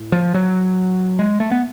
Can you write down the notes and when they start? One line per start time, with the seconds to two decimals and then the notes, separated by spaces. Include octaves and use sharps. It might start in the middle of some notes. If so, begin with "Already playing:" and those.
Already playing: A2
0.12 F3
0.34 F#3
1.19 G#3
1.40 A3
1.51 B3